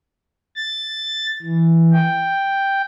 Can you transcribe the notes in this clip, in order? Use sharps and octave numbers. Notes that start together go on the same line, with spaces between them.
A6
E3
G5